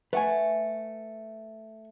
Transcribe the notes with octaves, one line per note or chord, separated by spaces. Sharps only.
A3 B4 F#5 G#5